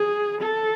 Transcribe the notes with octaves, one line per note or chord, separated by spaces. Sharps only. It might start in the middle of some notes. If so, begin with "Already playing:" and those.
Already playing: G#4
A4